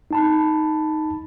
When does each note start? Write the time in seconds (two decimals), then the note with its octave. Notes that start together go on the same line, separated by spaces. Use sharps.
0.11 D#4 A5 B5